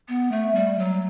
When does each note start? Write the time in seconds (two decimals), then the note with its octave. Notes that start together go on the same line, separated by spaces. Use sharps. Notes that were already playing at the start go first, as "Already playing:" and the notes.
0.08 B3
0.32 A3
0.55 G3
0.79 F#3